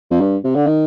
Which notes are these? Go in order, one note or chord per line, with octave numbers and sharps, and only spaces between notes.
F2
G2
C3
D3
D#3